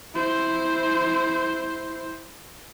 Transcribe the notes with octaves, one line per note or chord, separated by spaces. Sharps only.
E4 C5